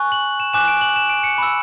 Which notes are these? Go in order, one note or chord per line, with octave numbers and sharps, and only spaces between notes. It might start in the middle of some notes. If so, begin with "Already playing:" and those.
Already playing: G#5 C#6 F#6
F#7
E7
G#5 D6 F#6 E7
D7
F#7
E7
D7
C#7
B5 E6